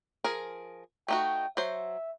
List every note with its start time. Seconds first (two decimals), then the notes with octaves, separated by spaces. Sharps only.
0.24 F3 G#4 A#4
1.08 A3 D#4 F#4 G5
1.57 F#3 C5 E5